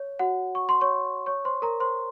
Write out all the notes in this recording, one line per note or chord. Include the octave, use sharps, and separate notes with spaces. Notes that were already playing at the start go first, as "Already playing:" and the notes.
Already playing: C#5
F#4 F#5
C#6
C6
C#5 C#6
C#5 C#6
C5 C6
A#4 A#5
C5 C6